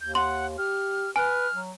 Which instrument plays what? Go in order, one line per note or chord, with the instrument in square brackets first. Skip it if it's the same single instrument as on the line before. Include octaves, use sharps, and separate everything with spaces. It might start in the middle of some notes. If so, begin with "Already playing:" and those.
[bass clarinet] D#2 [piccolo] G6
[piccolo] F#5 [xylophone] C6
[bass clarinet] G4 [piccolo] F6
[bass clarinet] B4 [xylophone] G#5 [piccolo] F6
[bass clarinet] F#3